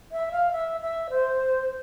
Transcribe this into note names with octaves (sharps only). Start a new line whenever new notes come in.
E5
F5
E5
E5
C5